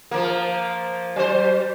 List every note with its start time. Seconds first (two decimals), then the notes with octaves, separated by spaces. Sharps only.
0.11 F3 A#3
1.16 F#3 C5